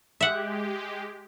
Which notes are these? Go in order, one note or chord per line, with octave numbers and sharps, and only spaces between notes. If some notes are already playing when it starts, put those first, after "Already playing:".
G#3 G4 E5 F#5